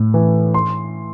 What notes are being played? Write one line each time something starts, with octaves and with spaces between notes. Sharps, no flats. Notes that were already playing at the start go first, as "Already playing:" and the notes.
Already playing: A2
E3
C6